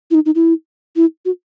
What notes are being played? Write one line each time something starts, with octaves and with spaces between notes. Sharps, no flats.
E4
D#4
D#4
E4
E4
F#4